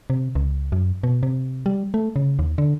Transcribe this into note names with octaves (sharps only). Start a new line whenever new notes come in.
C3
C#2
F#2
B2
C3
G3
A3
C#3
D#2
D3